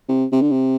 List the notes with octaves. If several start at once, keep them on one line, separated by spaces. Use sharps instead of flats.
C3
C3
D3
C3